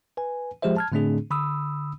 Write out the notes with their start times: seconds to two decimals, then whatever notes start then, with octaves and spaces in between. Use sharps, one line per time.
0.17 B4 G#5
0.62 F3 G#3 G4 G#4 C5 E5
0.77 A5 F6 G#6
0.92 A2 D3 A3 C4 D4 G#4
1.30 D3 B5 D#6 E6